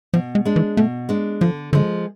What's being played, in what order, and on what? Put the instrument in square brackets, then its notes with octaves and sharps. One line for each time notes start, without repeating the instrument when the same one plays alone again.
[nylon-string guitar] B2 [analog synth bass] F3
[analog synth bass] G#3
[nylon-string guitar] G#3 D4
[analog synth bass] E3
[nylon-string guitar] B2 [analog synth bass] A3
[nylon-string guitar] G#3 D4
[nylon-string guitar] D3 [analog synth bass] F3
[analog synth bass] D3 [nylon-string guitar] F3 G#3